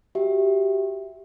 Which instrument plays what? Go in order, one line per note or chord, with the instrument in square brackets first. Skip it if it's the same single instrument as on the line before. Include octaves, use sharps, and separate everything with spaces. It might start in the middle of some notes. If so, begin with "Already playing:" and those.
[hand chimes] F#4 G4 E5